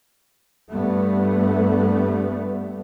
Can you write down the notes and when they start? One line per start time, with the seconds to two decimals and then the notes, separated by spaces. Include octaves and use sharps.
0.71 G2 G3 A3 B3